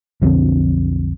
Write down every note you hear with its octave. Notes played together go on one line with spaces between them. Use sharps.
B1 F2 D3 C4